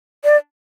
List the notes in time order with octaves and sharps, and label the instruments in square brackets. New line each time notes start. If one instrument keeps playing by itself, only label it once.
[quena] D5